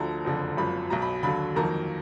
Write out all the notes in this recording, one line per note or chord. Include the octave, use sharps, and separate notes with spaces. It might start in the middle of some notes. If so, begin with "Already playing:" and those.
Already playing: D2 D3 F3 A#5
F#1 F2 D3
G#1 F#2 F3 B5
B1 B2 F#3 A#5
B5
D#2 D3 F#3 B5
F2 D#3 F#3 A#3 A#5